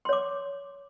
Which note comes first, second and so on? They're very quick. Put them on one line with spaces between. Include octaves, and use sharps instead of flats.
C6 C#5 D6